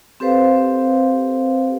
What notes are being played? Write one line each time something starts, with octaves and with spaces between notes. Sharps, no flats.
C4 G4 A4 B4 C5 F5